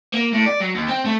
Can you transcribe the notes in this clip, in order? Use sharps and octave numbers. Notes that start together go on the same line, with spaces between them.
A#3
A2
D5
F#3
D#2
C4
A3